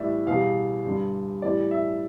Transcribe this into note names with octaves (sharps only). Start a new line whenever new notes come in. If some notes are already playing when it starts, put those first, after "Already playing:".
Already playing: A2 E3 G3 D5 E5
E2 B2 G3 F5
G2 D3 G3
A2 E3 G3 D5
E5